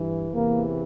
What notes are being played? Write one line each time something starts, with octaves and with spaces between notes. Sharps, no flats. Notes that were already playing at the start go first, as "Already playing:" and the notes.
Already playing: G2 E3
E2 C3 E3 A#3